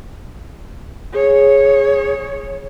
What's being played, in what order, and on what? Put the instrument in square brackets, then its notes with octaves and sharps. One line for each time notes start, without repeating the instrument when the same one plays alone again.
[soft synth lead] G#4 [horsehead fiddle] C#5